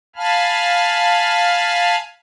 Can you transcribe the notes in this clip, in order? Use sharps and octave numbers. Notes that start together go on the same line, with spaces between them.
F5 G#5 A5 B5 F6